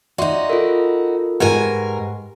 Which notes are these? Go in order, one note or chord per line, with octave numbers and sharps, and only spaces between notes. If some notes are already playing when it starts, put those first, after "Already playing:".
D#4 F#4 D5 E5 C6
F4 A4 A#4
G#2 G4 A#4 B4 F#5 G#5